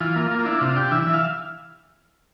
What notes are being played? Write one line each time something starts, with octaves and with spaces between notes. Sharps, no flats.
E3 F4
A#3
A#3
F4
D4 E4
C3 F4
D4 G4
E3 E5
E3 E5
F5